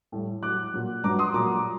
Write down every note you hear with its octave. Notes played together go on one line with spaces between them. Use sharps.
A2 G3
A2 F#3 D6 F#6
A#2 F#3
G2 F#3 A#5 D6
C6 D#6
A#2 F#3 A#5 D6